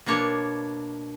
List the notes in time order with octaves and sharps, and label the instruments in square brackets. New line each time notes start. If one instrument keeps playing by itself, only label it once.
[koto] B2 A#3 D4 C#5